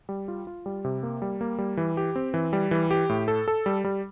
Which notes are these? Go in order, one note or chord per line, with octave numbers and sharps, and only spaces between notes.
G3
F4
F4
G3
C3
A#3
G3
A#3
G3
E3
G4
C4
E3
G3
E3
G4
A2
A4
A4
G3
G3